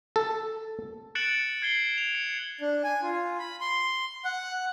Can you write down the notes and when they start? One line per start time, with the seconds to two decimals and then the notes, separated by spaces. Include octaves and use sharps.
0.16 A4
1.15 F#6 A6 C#7 D7 E7 F#7
1.62 G#6 C7 G7
1.98 F7
2.15 C#7
2.61 D4
2.84 G#5
3.03 F4
3.39 B5
3.61 C6
4.25 F#5